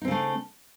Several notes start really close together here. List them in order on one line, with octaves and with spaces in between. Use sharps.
D#4 C4 C#3 A3